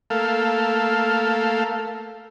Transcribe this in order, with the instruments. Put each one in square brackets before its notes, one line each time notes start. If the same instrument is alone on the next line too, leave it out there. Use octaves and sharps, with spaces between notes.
[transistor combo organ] A3 A#3 A4 F5